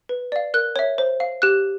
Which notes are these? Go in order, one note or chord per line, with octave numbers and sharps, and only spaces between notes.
B4
D5 F5
A#4 F#6
C#5 E5
C5
F5
G4 F#6